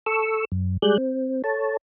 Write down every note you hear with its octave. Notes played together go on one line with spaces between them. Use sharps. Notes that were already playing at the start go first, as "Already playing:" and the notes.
A4 C#6 E6
F#2
G3 G#3 G#4 D5 F#6 G6
C4
A4 C#5 A5